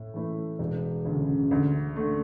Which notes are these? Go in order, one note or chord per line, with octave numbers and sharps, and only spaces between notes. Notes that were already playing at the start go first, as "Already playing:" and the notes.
Already playing: A2
E3 A3 E4
E1
D2 C#3
D2
D3 A3